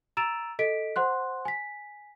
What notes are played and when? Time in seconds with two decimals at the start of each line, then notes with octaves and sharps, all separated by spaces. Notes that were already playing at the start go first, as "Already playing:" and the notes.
0.17 A#5 E6 A6 D7 E7 F7
0.59 A4 D#5 B6 D7
0.96 C5 F#5 C6 F#6
1.45 G#5 B6